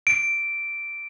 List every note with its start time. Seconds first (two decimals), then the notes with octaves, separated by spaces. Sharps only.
0.07 D7